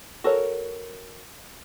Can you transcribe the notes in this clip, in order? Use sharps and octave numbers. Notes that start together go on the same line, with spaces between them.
F#4 A4 A#4 C#5